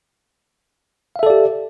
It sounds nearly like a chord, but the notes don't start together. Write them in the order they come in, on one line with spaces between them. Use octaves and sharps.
F5 E5 A4 D5 G4